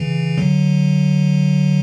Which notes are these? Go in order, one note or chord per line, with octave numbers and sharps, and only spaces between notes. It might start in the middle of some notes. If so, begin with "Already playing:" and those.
Already playing: C#3 E3
D3 F#3